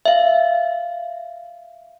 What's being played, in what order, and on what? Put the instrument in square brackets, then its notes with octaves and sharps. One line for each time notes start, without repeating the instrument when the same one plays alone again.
[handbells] E5 F5